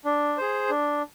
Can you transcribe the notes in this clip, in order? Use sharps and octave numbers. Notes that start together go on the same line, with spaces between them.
D4
G#4 C5
D4